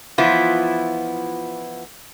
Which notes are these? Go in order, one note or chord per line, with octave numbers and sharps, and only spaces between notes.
E3 F3 B3 E4 F4